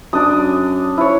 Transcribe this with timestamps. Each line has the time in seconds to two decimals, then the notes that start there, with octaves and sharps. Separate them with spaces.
0.13 F#2 D4 D#6
0.97 E4 C#5